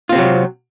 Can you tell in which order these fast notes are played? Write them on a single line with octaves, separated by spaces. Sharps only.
F4 C4 C3 F#3